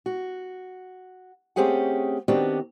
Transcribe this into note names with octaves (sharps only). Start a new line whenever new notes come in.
F#4
A3 C4 C#4 G4 G#4 F#5
D#3 B3 C4 D4 F#4 G4